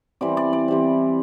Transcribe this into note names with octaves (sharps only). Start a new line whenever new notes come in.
E3 G3 C4 D5
D5
D5
E3 G3 C4